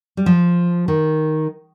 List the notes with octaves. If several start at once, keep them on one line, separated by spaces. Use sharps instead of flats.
G3
F3
D#3